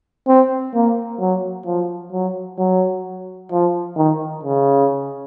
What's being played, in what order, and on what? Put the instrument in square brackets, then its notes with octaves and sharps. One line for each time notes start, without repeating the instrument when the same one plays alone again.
[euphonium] C4
A#3
F#3
F3
F#3
F#3
F3
D#3
C#3